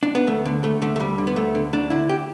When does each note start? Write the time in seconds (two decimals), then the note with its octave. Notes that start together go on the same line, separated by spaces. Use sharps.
0.03 D4
0.15 B3
0.27 D2 A3
0.46 D3
0.63 D2 A3
0.82 D3 A3
0.96 A3
1.00 D2 G3
1.18 D3
1.27 B3
1.36 D2 A3
1.55 D3
1.73 D2 D4
1.90 D3 E4
2.09 G4